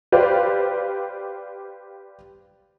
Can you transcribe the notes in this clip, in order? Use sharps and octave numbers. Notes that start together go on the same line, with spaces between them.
G4 B4 C5 D5 F5